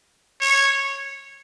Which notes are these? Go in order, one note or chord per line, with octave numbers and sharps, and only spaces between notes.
C#5